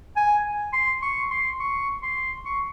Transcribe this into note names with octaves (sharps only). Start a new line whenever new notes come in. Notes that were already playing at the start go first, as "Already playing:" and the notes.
G#5
C6
C#6
C6
C#6
C6
C#6